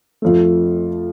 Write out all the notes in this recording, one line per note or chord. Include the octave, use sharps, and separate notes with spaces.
F2 F3 A3